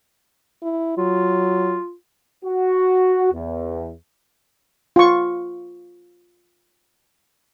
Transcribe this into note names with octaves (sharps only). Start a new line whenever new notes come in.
E4
F#3 F4
F#4
E2
F4 C#6